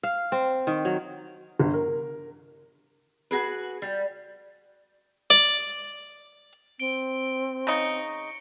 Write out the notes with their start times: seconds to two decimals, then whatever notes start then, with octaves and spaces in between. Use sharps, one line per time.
0.03 F5
0.32 C4
0.67 D#3
0.85 F#3
1.59 G1
1.74 A#4
3.31 F#4 G#4 B4
3.82 G3
5.30 D5
6.80 C4 D7 G7
7.67 C#3 D#4 C#6 A#6 C#7